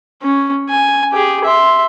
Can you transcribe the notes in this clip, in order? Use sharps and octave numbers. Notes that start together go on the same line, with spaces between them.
C#4
G#5
G4 G#4
E5 C6